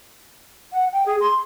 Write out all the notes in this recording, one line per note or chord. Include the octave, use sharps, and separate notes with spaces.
F#5
G5
G#4
C6